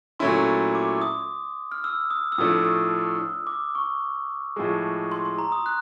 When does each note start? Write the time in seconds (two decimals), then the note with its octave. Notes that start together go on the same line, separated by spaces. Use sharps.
0.19 A#2 F#3 A3 C#4 E4 C6
0.75 D6
1.02 D#6
1.72 F6
1.84 E6
2.10 D#6
2.32 E6
2.38 A2 F3 A3 D4 D#6
2.65 D#6
3.47 D6
3.75 C#6
4.56 A2 F3 G#3
5.12 C6
5.25 C6
5.38 A#5
5.52 D#6
5.66 F#6